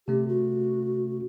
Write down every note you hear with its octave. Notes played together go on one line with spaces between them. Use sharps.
C3 A3 C#4 G4
F#4